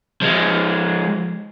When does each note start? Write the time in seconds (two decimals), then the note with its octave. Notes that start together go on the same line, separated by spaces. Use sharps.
0.22 F3 G#3